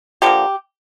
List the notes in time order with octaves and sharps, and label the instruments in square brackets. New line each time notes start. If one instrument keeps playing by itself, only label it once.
[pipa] D3 F3 A#3 G4